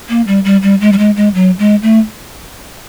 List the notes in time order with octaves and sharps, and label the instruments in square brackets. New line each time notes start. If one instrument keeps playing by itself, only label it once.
[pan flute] A#3
G3
G3
G3
G#3
G3
G#3
G#3
F#3
G#3
A3